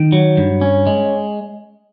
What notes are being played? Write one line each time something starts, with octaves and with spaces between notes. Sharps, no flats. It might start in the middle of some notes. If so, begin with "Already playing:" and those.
Already playing: D#3
F#3
G2
C#4
G#3